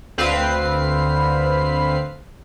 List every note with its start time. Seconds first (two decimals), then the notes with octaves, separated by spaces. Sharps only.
0.18 D2 C4 B4 F5 C7